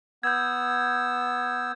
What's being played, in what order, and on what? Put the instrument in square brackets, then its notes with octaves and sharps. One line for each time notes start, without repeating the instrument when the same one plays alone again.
[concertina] B3 E6 [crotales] G6 G#6